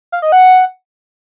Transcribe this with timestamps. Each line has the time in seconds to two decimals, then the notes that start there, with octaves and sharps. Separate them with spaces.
0.12 F5
0.22 D#5
0.32 F#5